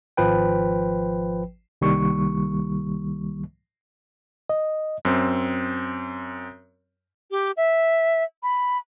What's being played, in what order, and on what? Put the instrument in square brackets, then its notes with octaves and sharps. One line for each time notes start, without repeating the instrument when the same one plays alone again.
[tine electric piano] G#1 F3 B4 G5
[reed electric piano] C2 D#3 G3 A#3 C#6
D#5
[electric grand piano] F#2 C4
[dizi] G4
E5
B5